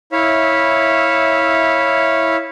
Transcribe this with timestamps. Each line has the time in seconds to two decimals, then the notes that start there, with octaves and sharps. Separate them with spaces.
0.12 E4 C#5 E5 F5